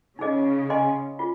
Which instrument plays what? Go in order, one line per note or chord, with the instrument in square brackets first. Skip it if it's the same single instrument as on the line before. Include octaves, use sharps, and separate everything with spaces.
[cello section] C#3 [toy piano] D#4 G#4 D#5
[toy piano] G#4 D#5 G#5 C6
F4 G#4